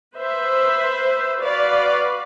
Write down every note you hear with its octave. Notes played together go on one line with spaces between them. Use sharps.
B4 C5 E5
F#4 B4 D5 F5